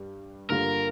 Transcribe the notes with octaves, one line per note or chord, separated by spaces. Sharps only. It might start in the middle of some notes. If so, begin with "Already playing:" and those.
Already playing: G2 G3
G2 D3 A#3 F4 A#4